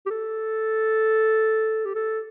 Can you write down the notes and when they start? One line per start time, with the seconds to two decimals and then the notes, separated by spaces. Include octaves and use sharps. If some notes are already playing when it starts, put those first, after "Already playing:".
0.06 G4
0.10 A4
1.85 G4
1.95 A4